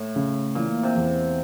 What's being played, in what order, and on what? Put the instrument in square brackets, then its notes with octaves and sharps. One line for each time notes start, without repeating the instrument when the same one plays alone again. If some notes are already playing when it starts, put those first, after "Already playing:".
Already playing: [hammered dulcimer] A2
[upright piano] C#3
[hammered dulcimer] A#2 [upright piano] E3
[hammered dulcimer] C3
[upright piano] E2